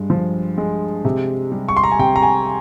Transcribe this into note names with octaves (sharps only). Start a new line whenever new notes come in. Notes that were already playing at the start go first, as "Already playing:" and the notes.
Already playing: G2 G#3
F3
G#3
C3
G3
C#6
C6
A#5
G#5
C3 G5
A#5
G#5